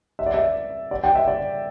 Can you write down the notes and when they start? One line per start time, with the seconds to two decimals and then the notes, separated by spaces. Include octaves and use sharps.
0.19 E5
0.26 D5
0.34 E5
0.91 D5
1.04 G5
1.15 E5
1.28 D5